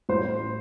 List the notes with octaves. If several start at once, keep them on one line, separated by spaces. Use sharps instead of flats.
A1 C5